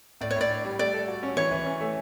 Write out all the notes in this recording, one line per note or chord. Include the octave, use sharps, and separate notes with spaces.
A2 D5
C#5
A2 D5
D4
G3
A3 D5
A4
F#4
C#4
E3 C#5
E3
C#4
A3